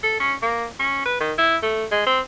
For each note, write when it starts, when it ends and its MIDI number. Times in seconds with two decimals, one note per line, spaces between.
0.04 0.17 69
0.20 0.34 61
0.42 0.66 58
0.79 1.02 61
1.06 1.16 71
1.20 1.33 51
1.38 1.56 64
1.62 1.85 57
1.92 2.04 56
2.06 2.20 60